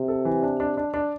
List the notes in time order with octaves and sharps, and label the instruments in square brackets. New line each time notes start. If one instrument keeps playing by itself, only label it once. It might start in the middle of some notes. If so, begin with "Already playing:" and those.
Already playing: [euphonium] C3
[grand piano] A4
E3
D4
D4
D4
D4